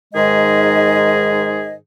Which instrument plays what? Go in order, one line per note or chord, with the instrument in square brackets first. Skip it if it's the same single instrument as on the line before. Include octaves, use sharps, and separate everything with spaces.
[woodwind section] G#2 D#3 G#3 G#4 D#5